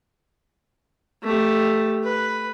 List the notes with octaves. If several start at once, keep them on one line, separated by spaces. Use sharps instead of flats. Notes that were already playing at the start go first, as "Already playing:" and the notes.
A3 G4
B4